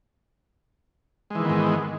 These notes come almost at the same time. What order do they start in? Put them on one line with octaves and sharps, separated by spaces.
G#3 E3 D#3 B3 G#2